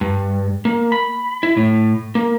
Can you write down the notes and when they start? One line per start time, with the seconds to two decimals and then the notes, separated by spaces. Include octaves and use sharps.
0.01 G2
0.65 A#3
0.92 B5
1.43 E4
1.57 A2
2.15 A#3